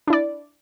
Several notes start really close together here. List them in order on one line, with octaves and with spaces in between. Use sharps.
D4 E4 D5